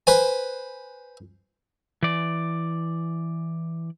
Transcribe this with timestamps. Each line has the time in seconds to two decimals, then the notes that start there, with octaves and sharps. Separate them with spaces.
0.07 B4 C5 G#5
2.03 E3 D5